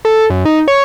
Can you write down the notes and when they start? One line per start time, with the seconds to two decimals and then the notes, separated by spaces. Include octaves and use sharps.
0.05 A4
0.30 F#2
0.45 D#4
0.68 C#5